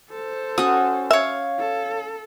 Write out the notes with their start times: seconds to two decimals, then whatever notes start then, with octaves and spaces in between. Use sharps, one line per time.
0.10 A4 C5
0.58 C#4 F#4 D#6
1.11 C#5 E5 F5
1.59 A4